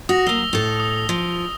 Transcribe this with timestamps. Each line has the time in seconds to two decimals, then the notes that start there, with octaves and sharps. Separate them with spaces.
0.09 F#4 D#6 A#6
0.27 F#3 A#3 E6 F7 G7
0.53 A2 A4
0.80 D#6
1.09 F3